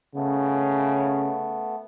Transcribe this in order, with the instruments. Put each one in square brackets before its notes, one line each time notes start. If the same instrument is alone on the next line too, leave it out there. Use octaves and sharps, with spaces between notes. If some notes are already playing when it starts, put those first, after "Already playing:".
[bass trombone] C#3 [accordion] A3 B3